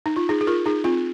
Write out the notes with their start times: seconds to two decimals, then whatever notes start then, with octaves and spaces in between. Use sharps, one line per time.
0.06 D#4
0.16 F4
0.29 D#4 G#4
0.41 G#4
0.47 F4 A#4
0.66 D#4 G#4
0.84 C4 F4